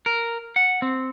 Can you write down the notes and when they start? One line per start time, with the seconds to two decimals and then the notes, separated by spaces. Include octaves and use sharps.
0.06 A#4
0.56 F#5
0.82 C4